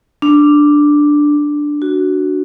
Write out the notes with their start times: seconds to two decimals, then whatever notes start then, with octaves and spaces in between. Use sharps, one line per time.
0.22 D4
1.82 F#4